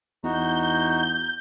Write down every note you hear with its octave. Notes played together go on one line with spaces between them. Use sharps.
E2 D#4 F#4 G6